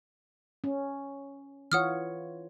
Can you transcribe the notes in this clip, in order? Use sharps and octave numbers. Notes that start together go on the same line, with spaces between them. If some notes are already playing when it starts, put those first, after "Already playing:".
C#4
E3 F4 C#5 F#5 D#6 F6